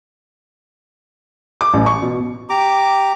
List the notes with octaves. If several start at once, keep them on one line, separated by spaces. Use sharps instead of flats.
D6
A1
C#6
B2
G4 A#5 D6